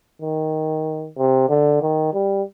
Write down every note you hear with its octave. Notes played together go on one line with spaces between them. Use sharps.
D#3
C3
D3
D#3
G3